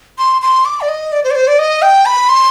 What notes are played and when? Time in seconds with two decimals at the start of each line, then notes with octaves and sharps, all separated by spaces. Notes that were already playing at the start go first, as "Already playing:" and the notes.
0.18 C6
0.42 C6
0.65 D6
0.81 D5
0.89 D#5
1.12 D5
1.24 C5
1.31 D5
1.35 C5
1.47 D5
1.59 D#5
1.82 G5
2.06 B5
2.29 C6